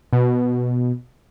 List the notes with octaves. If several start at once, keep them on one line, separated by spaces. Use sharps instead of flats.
B2